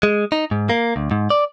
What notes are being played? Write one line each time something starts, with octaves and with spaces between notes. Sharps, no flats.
G#3
D#4
G#2
A#3
D2
G#2
D5